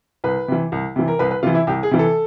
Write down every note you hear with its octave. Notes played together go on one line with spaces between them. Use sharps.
C2 B4
C3 E3
C2
C3 E3
A#4
C2 B4
B4
C3 E3 F4
E4
C2 G4
G#4
C3 E3
A4